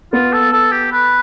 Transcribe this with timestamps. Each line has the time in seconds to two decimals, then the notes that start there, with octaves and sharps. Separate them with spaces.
0.13 B3 F4
0.33 A4
0.52 A4
0.72 G4
0.92 B4